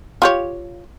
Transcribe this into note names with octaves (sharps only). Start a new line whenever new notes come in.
F4 G4 C#5